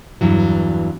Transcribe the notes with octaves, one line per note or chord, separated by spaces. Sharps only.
E2 G2 E3 F#3